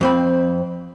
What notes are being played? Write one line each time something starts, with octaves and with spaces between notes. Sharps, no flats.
F2 C4 B5